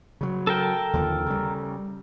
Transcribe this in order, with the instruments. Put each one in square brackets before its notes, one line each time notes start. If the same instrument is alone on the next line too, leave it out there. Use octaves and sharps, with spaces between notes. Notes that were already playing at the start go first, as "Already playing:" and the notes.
[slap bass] C#3 F#3
[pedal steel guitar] A4 A#4 G5
[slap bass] D#2 D3 F3
C#3 G3